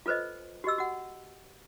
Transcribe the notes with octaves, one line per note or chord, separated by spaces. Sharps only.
F4 A4 B4 C5 D#5
F#4 G4 D#5 E6
F#4 F#5